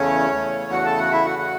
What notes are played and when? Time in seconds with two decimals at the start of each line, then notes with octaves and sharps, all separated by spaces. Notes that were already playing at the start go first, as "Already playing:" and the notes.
Already playing: E2 C#3 A3 C#4 C#5
0.31 E2 C#3 A3
0.72 F#4 F#5
0.85 A4 A5
0.98 F#4 F#5
1.12 E4 E5
1.25 F#4 F#5
1.39 F#4 F#5